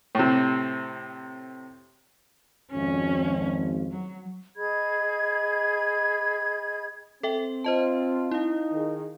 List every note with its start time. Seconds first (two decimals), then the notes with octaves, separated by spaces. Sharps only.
0.15 A2 C3
2.73 G#1 F2 C#4
3.91 F#3
4.56 G#4 D#5 B5 G#6
7.23 C4 A4 E5 G5
7.64 F4 C5 D#5 A5
8.31 D#4 E4 F5
8.72 D#3 G#4